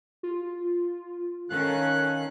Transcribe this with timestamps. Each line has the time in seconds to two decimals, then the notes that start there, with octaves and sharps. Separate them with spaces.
0.23 F4
1.50 D#3 C#4 A4 A#4 F5 F#6